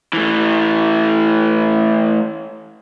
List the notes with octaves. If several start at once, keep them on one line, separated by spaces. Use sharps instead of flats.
E3 A3